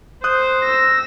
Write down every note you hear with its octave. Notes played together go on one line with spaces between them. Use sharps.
C5 D#6 F#6
E6 A#6